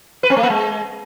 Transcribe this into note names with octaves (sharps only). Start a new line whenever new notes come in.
B4
C4
A3
A#3
G#3